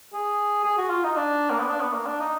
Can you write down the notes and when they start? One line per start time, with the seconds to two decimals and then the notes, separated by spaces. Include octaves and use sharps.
0.13 G#4
0.64 G#4
0.78 F#4
0.90 F4
1.04 D#4
1.16 D4
1.50 A#3
1.59 B3
1.68 D4
1.80 B3
1.93 A#3
2.06 D4
2.20 D#4